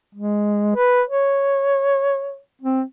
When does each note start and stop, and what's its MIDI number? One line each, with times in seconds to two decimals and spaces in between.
0.15 0.74 56
0.75 1.02 71
1.09 2.38 73
2.62 2.82 60